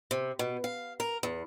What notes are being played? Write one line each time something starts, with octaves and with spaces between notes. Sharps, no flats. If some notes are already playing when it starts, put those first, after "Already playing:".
C3
B2
F5
A#4
E2